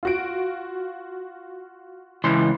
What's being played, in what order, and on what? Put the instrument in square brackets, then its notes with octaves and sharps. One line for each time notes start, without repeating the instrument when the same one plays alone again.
[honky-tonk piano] F4 F#4 D7
[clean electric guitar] C#2 E3 C6